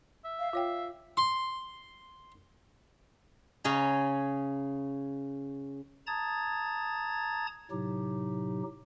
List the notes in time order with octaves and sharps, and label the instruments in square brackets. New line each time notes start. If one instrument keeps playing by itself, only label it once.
[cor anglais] E5
[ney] F5
[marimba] F4 C#5 G5 [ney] F5
[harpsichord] C6
[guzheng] C#3 C#4 G#4 A#5
[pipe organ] A5 A#5 D#6 G#6 A6
A2 C3 F#3 D#4 G4